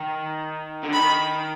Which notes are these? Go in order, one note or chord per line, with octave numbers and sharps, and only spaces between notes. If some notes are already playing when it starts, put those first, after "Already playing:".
Already playing: D#3
D3
D#3 B5